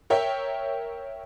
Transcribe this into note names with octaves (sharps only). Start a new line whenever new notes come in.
A#4 C#5 E5 G5